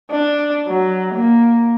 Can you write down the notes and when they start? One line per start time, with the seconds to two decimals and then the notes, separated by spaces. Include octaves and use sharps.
0.12 D4
0.67 F#3
1.15 A#3